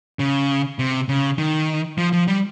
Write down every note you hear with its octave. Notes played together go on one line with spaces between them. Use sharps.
C#3
C3
C#3
D#3
F3
F3
G3